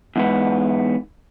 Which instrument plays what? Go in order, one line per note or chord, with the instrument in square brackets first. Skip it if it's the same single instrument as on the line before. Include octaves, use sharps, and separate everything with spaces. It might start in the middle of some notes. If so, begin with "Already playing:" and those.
[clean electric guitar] E2 G#2 B3